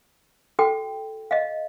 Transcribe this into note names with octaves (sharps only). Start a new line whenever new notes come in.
F#4 A4 G5
D#5 F5